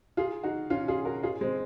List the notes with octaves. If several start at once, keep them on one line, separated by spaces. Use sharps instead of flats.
F4 G#4
D#4 F#4
C#4 F4
F4 G#4
F#4 A#4
F4 G#4
G#3 C4